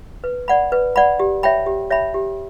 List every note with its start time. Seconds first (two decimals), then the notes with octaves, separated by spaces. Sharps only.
0.24 B4
0.48 D5 F#5 B5
0.72 B4
0.96 D5 F#5 B5
1.20 G4
1.43 C#5 E5 G5 B5
1.66 G4
1.90 C#5 E5 G5 B5
2.14 G4